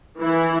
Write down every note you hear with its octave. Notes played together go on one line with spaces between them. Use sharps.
E3 E4